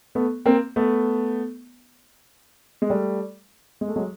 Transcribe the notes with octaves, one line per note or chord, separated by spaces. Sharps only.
A3 B3
A#3 C4
A3 B3
G#3
G3 A3
G#3
A3
F#3 G#3